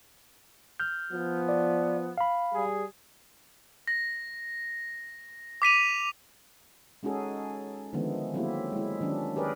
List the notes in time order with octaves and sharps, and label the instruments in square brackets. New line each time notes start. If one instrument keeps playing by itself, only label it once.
[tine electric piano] F6 G6
[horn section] F3 B3
[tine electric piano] D5
F5 B5
[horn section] G3 G#4
[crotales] A#6
D6 B6 D#7 F7
[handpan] G#3 C#4 D#4 F#4 G#4 A4
D3 D#3 F3 G#3 A3 B3
F#3 A3 A#3 C4 E4 G4
G#3 E4
D#3 F#3 C#4 D4
G4 G#4 A#4 B4 D5